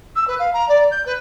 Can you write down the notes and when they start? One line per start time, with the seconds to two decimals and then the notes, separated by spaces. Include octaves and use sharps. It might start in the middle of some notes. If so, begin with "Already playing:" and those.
0.15 E6
0.27 B4
0.39 F5
0.53 A#5
0.68 D5
0.91 G6
1.06 B4